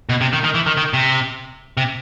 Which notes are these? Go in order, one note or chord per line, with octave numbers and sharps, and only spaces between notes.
B2
C3
D#3
D#3
E3
D#3
D#3
C3
C3